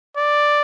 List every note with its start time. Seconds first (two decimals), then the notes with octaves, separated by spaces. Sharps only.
0.17 D5